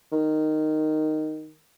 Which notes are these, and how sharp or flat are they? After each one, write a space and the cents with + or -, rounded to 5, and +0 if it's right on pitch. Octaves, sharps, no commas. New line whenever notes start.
D#3 -5